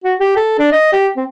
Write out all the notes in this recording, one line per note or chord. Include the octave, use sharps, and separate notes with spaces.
F#4
G4
A4
D4
D#5
G4
C4